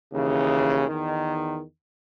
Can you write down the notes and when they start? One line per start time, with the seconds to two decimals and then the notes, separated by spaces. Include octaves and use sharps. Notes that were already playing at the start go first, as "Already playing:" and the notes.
0.12 D#2 C#3 E3
0.88 E2 D#3